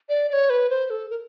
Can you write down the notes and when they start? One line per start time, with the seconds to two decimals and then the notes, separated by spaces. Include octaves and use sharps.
0.09 D5
0.29 D5
0.33 C#5
0.50 B4
0.70 C5
0.90 A4
1.10 A#4